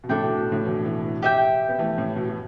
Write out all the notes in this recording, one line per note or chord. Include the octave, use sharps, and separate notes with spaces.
B2
A2 D3 D4 A4 E5 G5
B2
B2
A2 D3
B2 E3
B2 E3
G4 E5 G5
B3
E3 A3
A2
B2
B2